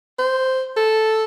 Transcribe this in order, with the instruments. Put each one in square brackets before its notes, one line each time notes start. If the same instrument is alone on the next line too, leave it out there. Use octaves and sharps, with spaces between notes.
[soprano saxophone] C5
A4